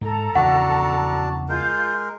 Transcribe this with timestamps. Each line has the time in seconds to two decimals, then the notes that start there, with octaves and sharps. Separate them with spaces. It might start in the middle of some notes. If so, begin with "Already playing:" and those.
0.01 G#2 A4 A#5
0.35 E2 C#3 F3 D4 F#4 F#5 A5
1.49 G#3 F4 A#4 G6